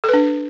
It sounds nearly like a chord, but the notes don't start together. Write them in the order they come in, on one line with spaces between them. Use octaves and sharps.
A4 B4 D4